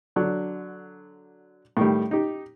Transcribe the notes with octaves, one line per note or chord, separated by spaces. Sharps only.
D3 F#3 D4
A2 D#3 G3
D#4 G4